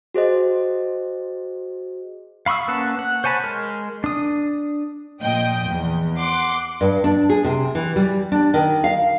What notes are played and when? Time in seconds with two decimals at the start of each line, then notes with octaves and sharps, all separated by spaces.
0.14 F#4 G#4 C5 D#5
2.46 F5 B5 C#6 D#6 E6
2.68 A#3 C#4 B4 F#5 A5
2.99 F#5
3.24 C5 C#5 G#5 A5 B5
3.44 G#3 A#4
4.04 D4 D#6
5.21 A#2 F3 D#5 G5
5.67 E2
6.18 F#5 C6 D6
6.81 G2
7.04 D4
7.30 G#4
7.44 C3
7.75 E3
7.96 G3
8.32 D4
8.54 D#3
8.84 F5